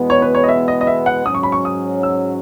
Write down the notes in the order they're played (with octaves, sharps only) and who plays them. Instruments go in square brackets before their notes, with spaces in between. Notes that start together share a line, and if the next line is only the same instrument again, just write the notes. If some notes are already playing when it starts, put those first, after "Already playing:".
Already playing: [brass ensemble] E2 B2 G#3 B3
[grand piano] C#5
B4
C#5
D#5
E5
D#5
D#5
E5
F#5
[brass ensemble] G#2 F#3 C#4 [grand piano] D#6
[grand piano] C#6
B5
C#6
D#6
E6